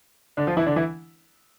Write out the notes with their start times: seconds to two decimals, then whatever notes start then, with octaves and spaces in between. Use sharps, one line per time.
0.37 D3 D4
0.47 F3 F4
0.57 E3 E4
0.66 D3 D4
0.76 E3 E4